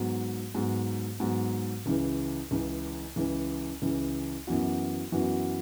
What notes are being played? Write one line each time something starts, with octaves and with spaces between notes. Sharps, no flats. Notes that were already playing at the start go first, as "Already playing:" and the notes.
Already playing: G#2 F#3 B3
G#2 F#3 B3
G#2 F#3 B3
C#2 C#3 E3
C#2 C#3 E3
C#2 C#3 E3
C#2 C#3 E3
F#2 E3 B3 F#4
F#2 E3 B3 F#4